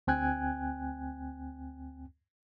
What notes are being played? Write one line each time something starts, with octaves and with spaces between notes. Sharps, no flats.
D2 C4 G5 G#5 F#6 G#6